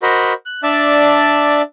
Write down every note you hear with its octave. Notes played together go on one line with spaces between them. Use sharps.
F#4 A#4 C5 D#5 B5
F#6
D4 D5 E5 A5